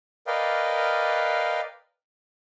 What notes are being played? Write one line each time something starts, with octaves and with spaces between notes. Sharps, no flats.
A#4 B4 D5 D#5 F5 G5